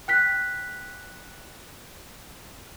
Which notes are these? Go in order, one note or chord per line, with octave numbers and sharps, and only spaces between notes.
G5 F#6 B6